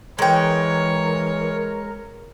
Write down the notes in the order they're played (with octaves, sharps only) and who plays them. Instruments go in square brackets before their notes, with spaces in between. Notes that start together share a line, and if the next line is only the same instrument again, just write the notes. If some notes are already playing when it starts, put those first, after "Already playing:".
[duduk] E3 [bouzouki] G#3 G5 [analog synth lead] A#4 [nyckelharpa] C#5